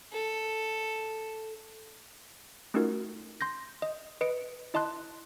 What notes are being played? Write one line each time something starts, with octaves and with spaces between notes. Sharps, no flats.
A4
A3 C#4 D#4 F4 F#4 A#4
C6 G6 A#6
D#5
B4 D#5 C#7 D7
E4 D#5 A5 C6 F#6